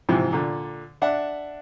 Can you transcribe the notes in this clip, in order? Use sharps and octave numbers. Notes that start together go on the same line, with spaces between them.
G#2 C3 E3 F3
A#2 D3
D4 E5 F#5